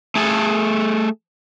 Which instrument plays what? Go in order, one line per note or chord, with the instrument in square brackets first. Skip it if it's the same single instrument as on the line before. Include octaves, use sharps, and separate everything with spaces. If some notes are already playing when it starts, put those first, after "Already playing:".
[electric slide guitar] A3 G#4 A4